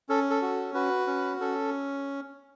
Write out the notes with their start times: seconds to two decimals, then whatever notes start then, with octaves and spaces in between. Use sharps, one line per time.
0.09 C#4 A4
0.30 A4
0.42 F#4
0.74 F#4 B4
1.07 C#4
1.40 C#4 A4